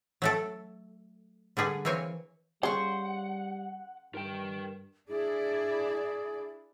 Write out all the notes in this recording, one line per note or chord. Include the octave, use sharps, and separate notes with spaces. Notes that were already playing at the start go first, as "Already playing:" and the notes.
F#3 A3 A4
D3 G3 G#4 B4
E3 A#3 C4 C#5 G#5
C#3 G3 C5 F#5 C#6
G2 A#4 G5
D4 E4 G#4 D5